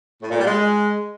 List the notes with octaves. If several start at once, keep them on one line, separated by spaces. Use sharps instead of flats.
A2
A#2
G3
G#3